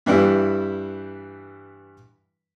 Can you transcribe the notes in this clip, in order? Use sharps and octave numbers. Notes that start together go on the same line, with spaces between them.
G2 E3 G3 E4